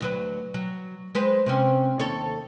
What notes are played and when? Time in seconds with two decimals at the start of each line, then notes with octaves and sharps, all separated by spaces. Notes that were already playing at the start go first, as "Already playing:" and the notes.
0.01 D2 F#3 B4
0.54 F#3
1.15 G#3 B4 C5
1.46 C3 C4 C#4
1.99 D#2 A4 C#5